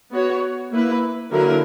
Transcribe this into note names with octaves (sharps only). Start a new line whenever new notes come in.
B3 F#4 C#5
A#3 E4 B4
D3 F#3 A#3 E4 A#4